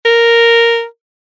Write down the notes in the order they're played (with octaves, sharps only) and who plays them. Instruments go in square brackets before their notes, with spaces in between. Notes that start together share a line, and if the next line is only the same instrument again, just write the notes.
[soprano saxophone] A#4